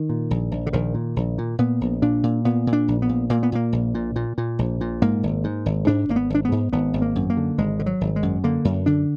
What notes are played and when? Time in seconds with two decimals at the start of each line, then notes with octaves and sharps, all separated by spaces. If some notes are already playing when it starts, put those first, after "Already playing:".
Already playing: D#3
0.10 A#2
0.31 A#1
0.52 A#1
0.66 D3
0.73 A#1 D#3
0.94 A#2
1.16 A#1
1.38 A#2
1.59 A#2 B3
1.81 A#1
2.02 A#2 D4
2.23 A#2
2.45 A#2 B3
2.67 A#2
2.73 D4
2.88 A#1
3.02 B3
3.09 A#2
3.30 A#2 A#3
3.43 B3
3.52 A#2 A#3
3.73 A#1
3.94 A#2
4.16 A#2
4.38 A#2
4.59 A#1
4.81 A#2
5.02 G#2 A#3
5.23 G#1
5.44 G#2
5.66 G#1
5.87 G#2 D4
6.09 G#1 A#3
6.16 B3
6.30 G#1 D4
6.45 B3
6.52 G#2
6.73 G#1 B3
6.94 G#1
7.02 A#3
7.15 F#2
7.30 A#3
7.37 D3
7.58 G#1 G#3
7.79 D3
7.86 F#3
8.01 G#1
8.16 G#3
8.23 F#2
8.44 D3 A#3
8.65 F#2
8.86 D3 D4